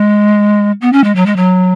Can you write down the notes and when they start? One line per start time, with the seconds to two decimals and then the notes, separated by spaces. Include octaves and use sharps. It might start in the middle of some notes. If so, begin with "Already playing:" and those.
Already playing: G#3
0.81 B3
0.93 C#4
1.04 G#3
1.16 F#3
1.26 G#3
1.36 F#3